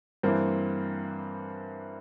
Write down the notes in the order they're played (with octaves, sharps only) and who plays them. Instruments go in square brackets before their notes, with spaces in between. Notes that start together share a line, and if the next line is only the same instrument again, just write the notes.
[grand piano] G2 E3 A#3 C4